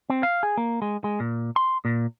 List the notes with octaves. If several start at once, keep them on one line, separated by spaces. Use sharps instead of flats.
C4
F5
G#4
A#3
G#3
G#3
A#2
C6
A#2